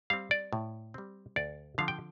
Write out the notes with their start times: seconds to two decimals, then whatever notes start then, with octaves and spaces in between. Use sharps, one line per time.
0.10 G3 C4 F5
0.31 D5
0.53 A2
0.94 G3 C4
1.36 D2 D5
1.78 D3 F3 C4 F5
1.88 G5